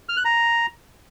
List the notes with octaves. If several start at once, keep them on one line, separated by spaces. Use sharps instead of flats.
F6
F#6
A#5